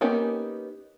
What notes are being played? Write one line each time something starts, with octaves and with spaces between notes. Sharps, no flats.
A#3 B3 C#4 D#4 G4